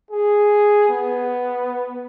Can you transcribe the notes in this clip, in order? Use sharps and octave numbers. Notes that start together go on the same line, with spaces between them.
G#4
B3